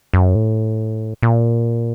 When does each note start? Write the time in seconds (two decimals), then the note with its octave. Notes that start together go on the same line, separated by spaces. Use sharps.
0.13 F#2
0.35 A2
1.23 A#2